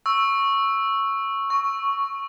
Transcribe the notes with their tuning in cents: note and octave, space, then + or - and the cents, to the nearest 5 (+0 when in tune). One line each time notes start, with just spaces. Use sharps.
C#6 -5 E6 +0
C#6 +5 E6 +0